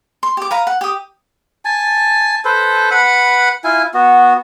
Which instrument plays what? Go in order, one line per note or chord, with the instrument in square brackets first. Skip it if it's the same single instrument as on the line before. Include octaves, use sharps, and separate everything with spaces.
[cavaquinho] C6
G4 D6
B4 F5 A#5
F#5
G4 D#6
[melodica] G#5 A5
A4 B4 C5
B4 F#5 B5
E4 F4 G#5
B3 F#4